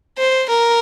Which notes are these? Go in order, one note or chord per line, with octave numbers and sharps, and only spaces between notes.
C5
A#4